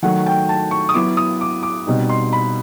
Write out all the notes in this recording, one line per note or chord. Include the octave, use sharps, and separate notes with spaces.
D#3 F#3 A3 F#5
G5
A5
C#6
D#6
F#3 B3 E4 D6
D#6
D6
D6
B2 G3 C4 D#4
C6
B5